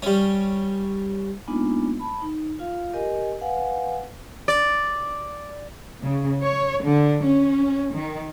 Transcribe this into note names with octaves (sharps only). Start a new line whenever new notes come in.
G3 C#4
G#3 A#3 B3 D4 D#4 F4
A5 B5
D#4
F4 F5
G4 A#4 D#5 G#5
B4 F5 F#5 G#5
D5
C#3
C#5
D3
C#4
D#3